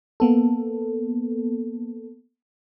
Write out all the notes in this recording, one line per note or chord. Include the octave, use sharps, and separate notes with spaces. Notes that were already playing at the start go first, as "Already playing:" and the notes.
A#3 B3 A4